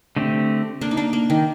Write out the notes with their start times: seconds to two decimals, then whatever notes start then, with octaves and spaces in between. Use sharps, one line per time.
0.16 D3 A3 C4 G4
0.81 A#3 D4
0.91 D#4
0.97 A#3 D4
1.13 A#3
1.30 D#3